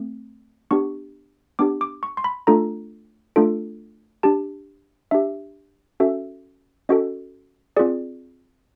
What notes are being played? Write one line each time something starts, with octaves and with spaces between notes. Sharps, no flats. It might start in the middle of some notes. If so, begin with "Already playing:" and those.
Already playing: A3 C4
B3 D4 G4 C#6
B3 D4 G4 D6
D6
C#6
C6
B5
A3 D4 F4 A4 A#5
A3 D4 F4 A4
D4 G4 A5
D4 G4 E5
C#4 F#4 A4 E5
C#4 F#4 A4 D#5
C4 F4 G#4 D5